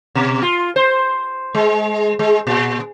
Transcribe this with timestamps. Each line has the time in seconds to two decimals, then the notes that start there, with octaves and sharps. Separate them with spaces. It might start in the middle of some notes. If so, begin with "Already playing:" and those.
0.15 B2
0.42 F4
0.76 C5
1.55 G#3
2.19 G#3
2.47 A#2